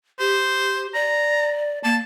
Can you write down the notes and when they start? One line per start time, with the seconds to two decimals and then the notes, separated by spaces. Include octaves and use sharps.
0.19 G4 C5
0.94 D5 A#5
1.84 A#3 A5